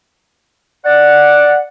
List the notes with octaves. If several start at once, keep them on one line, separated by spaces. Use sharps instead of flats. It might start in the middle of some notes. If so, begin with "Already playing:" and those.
D5 F#5